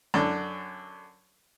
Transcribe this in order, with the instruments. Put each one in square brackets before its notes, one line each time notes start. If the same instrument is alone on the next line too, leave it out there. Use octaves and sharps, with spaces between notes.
[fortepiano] F#2 D3